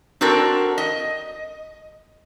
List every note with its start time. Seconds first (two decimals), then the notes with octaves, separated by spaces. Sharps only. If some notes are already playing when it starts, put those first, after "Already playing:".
0.21 C4 D4 F#4 A4 A#4
0.78 D#5